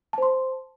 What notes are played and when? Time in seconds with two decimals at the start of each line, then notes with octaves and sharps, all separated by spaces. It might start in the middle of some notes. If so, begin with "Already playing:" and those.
0.13 A5
0.18 C5
0.22 C6